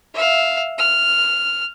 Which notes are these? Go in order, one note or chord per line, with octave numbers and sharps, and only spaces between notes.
E5 F5
F6